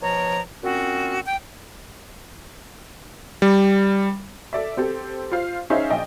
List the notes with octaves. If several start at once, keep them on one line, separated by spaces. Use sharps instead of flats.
B2 F3 C#5 A#5
A#2 C4 C#4 F#4
G5
G3
A4 D5 E5
C4 G4 A4
F4 C5 F5
C#4 D#4 G#4 C5 E5 F5
A#1 D5 D#5 G5 G#5